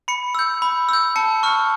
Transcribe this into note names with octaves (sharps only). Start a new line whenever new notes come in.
B5 C#7
E6 G6
B5
E6 G6
A5 C#7
C#6 F6